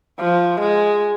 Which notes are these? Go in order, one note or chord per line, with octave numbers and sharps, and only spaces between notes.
F3
G#3